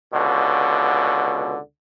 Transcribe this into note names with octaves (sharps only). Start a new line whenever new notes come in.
C#2 B2 D3